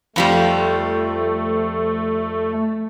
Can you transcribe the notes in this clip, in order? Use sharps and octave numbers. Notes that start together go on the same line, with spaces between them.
F2 F3 G3 A3